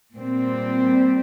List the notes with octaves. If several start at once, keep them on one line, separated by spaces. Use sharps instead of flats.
A#2 G3 C4